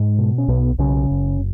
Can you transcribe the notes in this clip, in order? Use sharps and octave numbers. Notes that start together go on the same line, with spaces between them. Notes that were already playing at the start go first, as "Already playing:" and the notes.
Already playing: G#2 G#3
B2
C#4
B1 B2 B3
B1 C#3 C#4
F#1